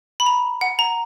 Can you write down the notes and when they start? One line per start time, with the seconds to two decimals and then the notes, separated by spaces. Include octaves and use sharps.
0.20 B5
0.26 A#5
0.61 F#5
0.79 A#5